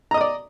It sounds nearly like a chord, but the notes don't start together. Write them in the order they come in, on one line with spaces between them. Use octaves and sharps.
A#5 D#5 D#6 D5